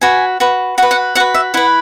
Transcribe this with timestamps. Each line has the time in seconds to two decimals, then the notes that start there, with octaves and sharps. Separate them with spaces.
0.01 F#4 B4 G#5
0.40 F#4 B4
0.78 F#4 F#5
0.82 B4
0.91 F#5
1.15 F#4 B4 F#5
1.34 E5
1.54 E4 B4 F#5